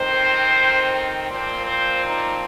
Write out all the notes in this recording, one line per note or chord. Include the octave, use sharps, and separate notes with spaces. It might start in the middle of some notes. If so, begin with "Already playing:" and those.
Already playing: F2 D#3 C4 C5
A#2 F3 C4 C5
C5
D#4